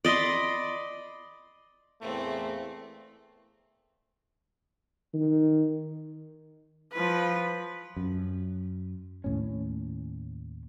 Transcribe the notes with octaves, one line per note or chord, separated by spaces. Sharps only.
D5 D#5 B5 C6
E2 A2 A3 A#3 C4
D#3
F3 B4
F#2
D#2 A2 C#4